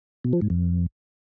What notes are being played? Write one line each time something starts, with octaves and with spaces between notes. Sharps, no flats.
B2
F3
G#2
F2